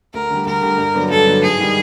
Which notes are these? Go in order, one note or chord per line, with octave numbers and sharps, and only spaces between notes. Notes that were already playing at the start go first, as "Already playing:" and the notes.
D2 A#4
D3 G3
D2 A#4
D3 G3
G2
D3 F#3 B3 D4
G2 A4
D3 F#3 B3 D4
G#2 G#4
D#3 G3